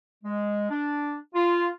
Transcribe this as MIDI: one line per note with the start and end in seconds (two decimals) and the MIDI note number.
0.23 0.66 56
0.69 1.15 62
1.34 1.67 65